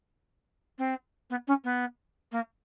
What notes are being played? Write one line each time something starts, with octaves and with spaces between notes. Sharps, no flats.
C4
B3
C#4
B3
A#3